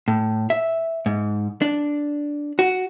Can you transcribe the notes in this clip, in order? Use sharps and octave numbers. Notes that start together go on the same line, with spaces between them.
A2
E5
G#2
D4
F#4